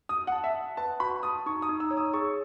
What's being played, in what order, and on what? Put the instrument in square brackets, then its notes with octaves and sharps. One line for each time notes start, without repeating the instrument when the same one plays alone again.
[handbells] F#4 [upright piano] D#6
[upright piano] F#5
[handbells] A5
[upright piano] E5
[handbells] F#5
[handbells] B4 [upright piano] A5
[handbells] F#4 [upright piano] B5
[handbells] A5 [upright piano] D#6
[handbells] D#4 [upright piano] C#6
[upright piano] D#6
[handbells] D#4
[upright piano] E6
[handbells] C#5
[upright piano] D#6
[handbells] G#4 [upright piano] C#6